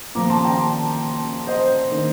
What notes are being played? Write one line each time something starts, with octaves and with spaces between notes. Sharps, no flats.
A#2 F3 C4 A#5 D6
A5 C6
G5 A#5
C5 D#5
D#3 A#3 D4